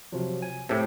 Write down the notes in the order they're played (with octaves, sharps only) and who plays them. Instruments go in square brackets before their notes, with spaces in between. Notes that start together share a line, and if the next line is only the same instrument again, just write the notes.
[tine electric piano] C3 F3 F#3
G#5
[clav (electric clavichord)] A2 C3 [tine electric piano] E4 G4 A4